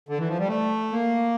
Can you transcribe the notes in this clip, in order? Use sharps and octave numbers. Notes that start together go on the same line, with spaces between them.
D3
E3
F3
G3
A3
A#3